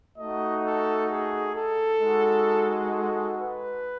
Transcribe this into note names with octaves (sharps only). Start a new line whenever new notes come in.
A3 D#4 F#4 D#5
A4
G#4
A4
G#3 D#4 F#4
A4
B4